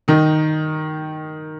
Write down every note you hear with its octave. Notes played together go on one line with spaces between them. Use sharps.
D#3 D#4